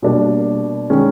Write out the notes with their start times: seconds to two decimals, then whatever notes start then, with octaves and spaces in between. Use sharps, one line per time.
0.02 B2 G3 A#3 D4
0.90 D#3 G#3 C#4